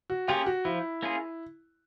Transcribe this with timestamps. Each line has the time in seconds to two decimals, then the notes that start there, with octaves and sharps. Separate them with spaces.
0.10 F#4
0.28 A#3 C#4 F4 G4 G#4
0.46 F#4
0.65 F3 E4
1.02 A#3 C#4 F4 G#4